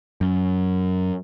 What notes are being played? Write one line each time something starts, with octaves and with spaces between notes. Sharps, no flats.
F#2